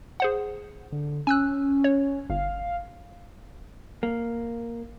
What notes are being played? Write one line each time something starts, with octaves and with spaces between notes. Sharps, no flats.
G#4 C5 F#5
D3
C#4 G#5 E6 F#6
C#5
G1 F5
A#3